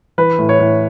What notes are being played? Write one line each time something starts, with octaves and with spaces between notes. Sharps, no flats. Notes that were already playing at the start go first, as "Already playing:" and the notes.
E3 B4
A2
C#5
A2